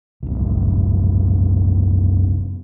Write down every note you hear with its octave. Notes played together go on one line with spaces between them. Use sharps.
F#1 C2